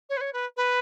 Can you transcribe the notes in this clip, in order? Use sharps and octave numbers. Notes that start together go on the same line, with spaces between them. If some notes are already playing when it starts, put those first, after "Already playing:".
C#5
B4
C#5
B4
B4